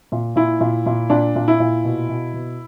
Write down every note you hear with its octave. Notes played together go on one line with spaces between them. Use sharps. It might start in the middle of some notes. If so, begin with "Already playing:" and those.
A#2
A#2 E4
A#2
A#2
A#2 D4
A#2
E4
A#2
B2
B2
B2